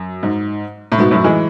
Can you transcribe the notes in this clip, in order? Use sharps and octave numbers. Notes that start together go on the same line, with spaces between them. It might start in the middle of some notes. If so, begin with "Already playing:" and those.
Already playing: F#2
G#2
A2
G#2 B2
F#2 A2
E3 G#3